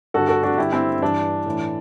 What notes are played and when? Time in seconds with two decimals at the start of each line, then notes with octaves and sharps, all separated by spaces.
0.14 G2 D3 F#4 A4
0.28 F#4 A4
0.43 D4 F#4
0.58 G2 D3 E4 G4
0.72 C4 E4
1.02 G2 E3 D4
1.46 A2 E3